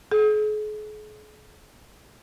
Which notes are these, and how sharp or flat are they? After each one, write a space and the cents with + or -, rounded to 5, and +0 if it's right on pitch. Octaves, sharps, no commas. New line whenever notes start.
G#4 +40